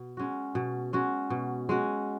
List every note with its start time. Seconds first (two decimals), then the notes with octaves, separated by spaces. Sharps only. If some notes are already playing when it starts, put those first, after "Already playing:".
Already playing: B2
0.17 G#3 C#4 F#4
0.55 B2
0.93 G#3 C#4 F#4
1.30 B2
1.69 G#3 C#4 F#4